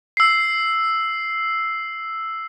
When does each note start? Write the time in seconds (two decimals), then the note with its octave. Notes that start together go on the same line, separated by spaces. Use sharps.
0.17 E6 C7